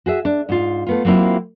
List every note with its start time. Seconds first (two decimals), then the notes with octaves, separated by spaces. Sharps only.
0.06 F#4 G#4 E5
0.25 D4
0.49 G#2 F4
0.87 A3 B3 F4
1.05 F#3 A#3 C4 E4 F4